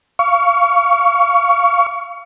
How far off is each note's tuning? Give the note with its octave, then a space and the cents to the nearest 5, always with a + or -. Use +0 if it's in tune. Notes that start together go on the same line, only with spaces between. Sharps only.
F5 -15 C#6 +25